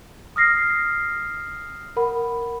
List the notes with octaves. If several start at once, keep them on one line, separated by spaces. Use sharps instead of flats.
D#6 F6 A#6 C7
A#4 F#5 B5